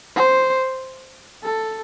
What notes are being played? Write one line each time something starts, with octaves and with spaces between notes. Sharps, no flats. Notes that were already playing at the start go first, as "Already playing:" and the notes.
C5
A4